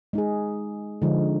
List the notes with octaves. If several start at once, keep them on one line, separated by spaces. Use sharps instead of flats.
G#3 D#4 G#4
D3 F3 G#3 D#4